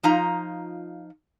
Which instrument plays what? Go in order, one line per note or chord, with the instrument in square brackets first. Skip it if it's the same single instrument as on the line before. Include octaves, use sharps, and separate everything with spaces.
[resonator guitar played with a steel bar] F3 D#4 F4 A#5